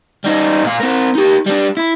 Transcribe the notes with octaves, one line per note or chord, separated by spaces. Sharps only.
G3 D#4
A#2 F5
C4 A#4
D#4 G4
G3 D4
E4